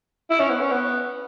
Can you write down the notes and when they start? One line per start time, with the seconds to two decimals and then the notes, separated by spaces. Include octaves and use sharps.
0.31 E4
0.40 C#4
0.50 B3
0.60 C#4
0.71 B3